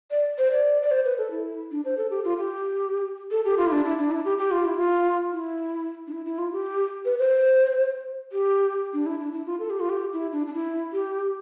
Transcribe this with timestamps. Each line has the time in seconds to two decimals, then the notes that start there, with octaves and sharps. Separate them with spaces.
0.11 D5
0.38 C5
0.52 D5
0.82 D5
0.91 C5
1.05 B4
1.18 A4
1.31 E4
1.71 D4
1.85 C5
1.98 A4
2.11 G4
2.25 F4
2.38 G4
3.31 A4
3.45 G4
3.58 F4
3.66 E4
3.72 D4
3.85 E4
3.99 D4
4.11 E4
4.25 G4
4.38 G4
4.51 F4
4.65 E4
4.77 F4
5.32 E4
6.07 D4
6.12 E4
6.26 E4
6.38 F4
6.52 G4
7.05 B4
7.19 C5
8.32 G4
8.94 D4
9.06 E4
9.20 D4
9.33 E4
9.46 F4
9.59 A4
9.70 G4
9.80 F4
9.90 G4
10.13 E4
10.33 D4
10.47 D4
10.54 E4
10.93 G4